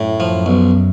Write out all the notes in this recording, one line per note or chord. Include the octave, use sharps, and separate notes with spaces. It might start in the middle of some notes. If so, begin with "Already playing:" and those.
Already playing: F#2 A2
F3
B1